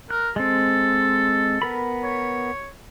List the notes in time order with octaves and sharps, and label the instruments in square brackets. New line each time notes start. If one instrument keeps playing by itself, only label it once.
[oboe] A#4 [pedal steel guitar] F#6
[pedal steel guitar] G#3 C4 [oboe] A4
[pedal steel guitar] B3 A#4 B5
[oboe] C#5